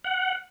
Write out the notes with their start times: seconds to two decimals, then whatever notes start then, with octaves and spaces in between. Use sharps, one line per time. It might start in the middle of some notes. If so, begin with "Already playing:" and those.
0.04 F#5